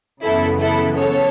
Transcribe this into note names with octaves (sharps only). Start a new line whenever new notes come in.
F#2 C#3 E3 B3 E4 A4
E4 A4
A4 C#5